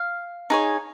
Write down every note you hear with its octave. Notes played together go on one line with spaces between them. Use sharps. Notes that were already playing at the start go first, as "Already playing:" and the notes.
Already playing: F5
D#4 G#4 C#5